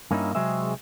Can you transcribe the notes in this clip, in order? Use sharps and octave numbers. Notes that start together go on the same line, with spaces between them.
G2 A#3 C#4 D#4 E4
C3 F#3 G#3 C4 G#4 E5